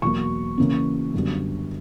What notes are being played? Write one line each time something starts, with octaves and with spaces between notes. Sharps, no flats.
E2 B2 F#3 A#3 C#6
C#3 E3 A#3 C#4
F#2 D3 G3 B3